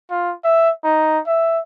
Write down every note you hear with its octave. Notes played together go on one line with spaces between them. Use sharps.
F4
E5
D#4
E5